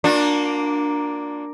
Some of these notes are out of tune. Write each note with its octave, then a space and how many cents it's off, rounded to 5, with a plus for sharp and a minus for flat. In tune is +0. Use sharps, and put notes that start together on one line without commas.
A#3 +0 D4 +0 F#4 -45